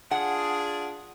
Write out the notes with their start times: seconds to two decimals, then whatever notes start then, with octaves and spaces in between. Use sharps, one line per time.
0.11 D4 F4 G#4 F#5